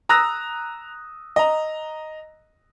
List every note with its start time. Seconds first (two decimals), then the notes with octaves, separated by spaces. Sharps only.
0.09 A#5 D#6 E6 F#6 A#6
1.36 D#5 A#5